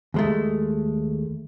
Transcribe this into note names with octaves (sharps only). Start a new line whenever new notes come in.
D#2 G#3 A3